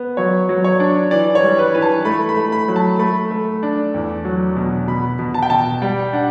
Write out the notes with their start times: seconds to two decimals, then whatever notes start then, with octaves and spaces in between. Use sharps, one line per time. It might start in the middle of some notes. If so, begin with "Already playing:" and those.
Already playing: B3
0.17 F#3 C#5
0.49 F#3
0.64 C#5
0.80 D4
1.11 E3 D5
1.35 C#5
1.43 G3
1.59 B4
1.74 E3 B4
1.82 A5
2.05 A3 B5
2.29 B5
2.37 A3
2.52 B5
2.68 F#3
2.76 A5
2.99 A3 B5
3.31 A3
3.63 D4
3.94 E2
4.25 F#3
4.56 B2
4.87 B2 B5
5.19 B2
5.34 A5
5.43 G5
5.50 B2 A5
5.82 G3 G5
6.13 D4 F#5